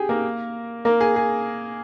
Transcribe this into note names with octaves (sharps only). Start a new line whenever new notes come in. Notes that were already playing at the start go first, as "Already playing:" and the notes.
Already playing: G4 G#4
A#3 A#4
A#3 A#4
G#4
G#4